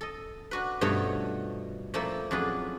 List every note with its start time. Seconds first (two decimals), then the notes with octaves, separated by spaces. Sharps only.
0.01 A4 D#5
0.51 D4 F#4 B4
0.81 G2 B2 F3 A3 F#4 C#5
1.94 A#2 F3 A3 A#3 E4 A5
2.31 F2 F#3 D4 F4 G#4 B4